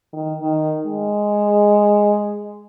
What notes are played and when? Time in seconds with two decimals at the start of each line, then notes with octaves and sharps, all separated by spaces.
0.13 D#3
0.41 D#3
0.86 G#3